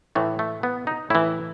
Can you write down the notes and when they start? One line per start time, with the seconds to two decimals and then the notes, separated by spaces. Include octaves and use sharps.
0.15 A2 E3 A3
0.39 A3
0.63 B3
0.87 D#4
1.10 A2 E3 E4